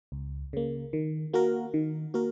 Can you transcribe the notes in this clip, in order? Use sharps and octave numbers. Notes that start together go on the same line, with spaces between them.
C#2
C#3 A#3
D#3
A#3 F#4 A#4
D#3
A#3 F#4 A#4